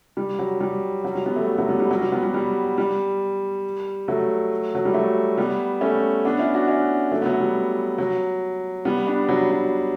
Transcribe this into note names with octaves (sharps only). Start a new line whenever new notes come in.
G3
F#3
G3
F#3
G3
G3 B3
F#3 A3
F#3 A3
G3 B3
G3
F#3
G3
G3 B3
G3 B3
G3
G3
F#3 A3
F#3
G3
F#3 A3
G3 B3
A3 C#4
B3 D4
C#4 E4
D4 F#4
C#4 E4
F#3 A3
B3
F#3 A3
G3
F#3
G3 B3
B3 D4
F#3
F#3